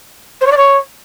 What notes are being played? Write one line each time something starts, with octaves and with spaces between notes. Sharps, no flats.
C5
C#5
D5
C#5